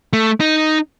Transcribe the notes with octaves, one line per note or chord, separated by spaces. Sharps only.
A3
D#4